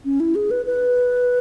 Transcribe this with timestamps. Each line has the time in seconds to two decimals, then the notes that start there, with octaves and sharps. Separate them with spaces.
0.05 C#4
0.20 E4
0.35 G#4
0.51 B4
0.66 B4